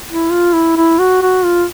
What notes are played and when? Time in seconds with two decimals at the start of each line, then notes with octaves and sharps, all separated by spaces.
0.10 E4
0.32 F4
0.54 E4
0.76 E4
0.99 F#4
1.22 F#4
1.44 F4